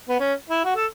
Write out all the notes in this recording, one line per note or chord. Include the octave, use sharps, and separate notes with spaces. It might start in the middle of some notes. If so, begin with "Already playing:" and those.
B3
C#4
E4
F#4
A4